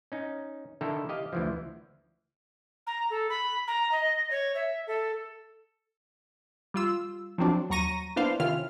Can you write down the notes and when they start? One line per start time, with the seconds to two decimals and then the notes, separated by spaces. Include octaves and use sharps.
0.12 C#4 D#4
0.81 D3 D#3 E4 A4 G5 A#5
1.09 G4 D#5 F5
1.33 D2 E3 F3
2.86 A#5
3.10 A4
3.29 B5
3.67 A#5
3.91 D#5
4.30 C#5
4.54 E5
4.86 A4
6.74 G3 F4 E6
7.38 F3 F#3 C4 D4 F#4
7.70 D#2 F#3 A#5 C#6 A#6 D#7
8.16 A#3 B3 D4 E4 C5 F5
8.40 C3 D#3 C#4 E4 F4 F6